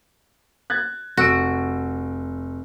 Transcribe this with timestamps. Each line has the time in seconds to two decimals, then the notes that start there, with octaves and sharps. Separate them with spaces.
0.70 F#6 G#6 A6
1.17 F1 F#4 E6 D7